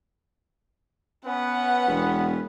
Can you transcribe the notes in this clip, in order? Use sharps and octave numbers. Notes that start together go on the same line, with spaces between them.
B3 C#4 B4 F#5
E1